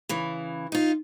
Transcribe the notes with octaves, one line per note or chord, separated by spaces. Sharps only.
C#3 E3
D#4 F4